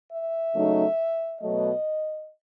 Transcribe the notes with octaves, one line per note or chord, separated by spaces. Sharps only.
E5
C#3 F#3 A3 D#4
B2 F#3 A3 D#5